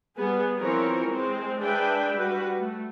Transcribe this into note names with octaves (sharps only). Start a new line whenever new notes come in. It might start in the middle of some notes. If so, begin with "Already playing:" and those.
G3 B3 G#4
E3 F3 C4 A#4 C#5
G#3 C4
G#3 D4 G#4 B4 E5 G5
G3 F#4 B4
A3